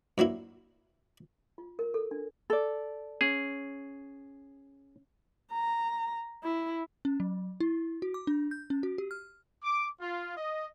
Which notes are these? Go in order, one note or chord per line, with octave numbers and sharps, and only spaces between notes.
G2 F#3 A#3 E4
F4
A#4
A4
D4
A4 D5
C#4 G#4
A#5
E4
C#4
F#3
E4
F#4
D6
D4
G6
C#4
F#4
G4
F6
D6
F4
D#5